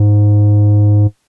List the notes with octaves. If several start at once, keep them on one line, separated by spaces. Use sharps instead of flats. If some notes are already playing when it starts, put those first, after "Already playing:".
Already playing: G#2